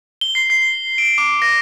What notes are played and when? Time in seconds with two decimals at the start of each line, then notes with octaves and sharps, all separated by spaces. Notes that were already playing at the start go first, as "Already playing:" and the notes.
0.21 G7
0.35 C7
0.50 C7
0.98 D7
1.18 D6
1.42 A#6